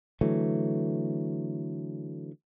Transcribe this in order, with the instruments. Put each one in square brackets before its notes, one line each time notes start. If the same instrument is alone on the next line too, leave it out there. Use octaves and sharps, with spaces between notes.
[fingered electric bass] D3 E3 F#3 A3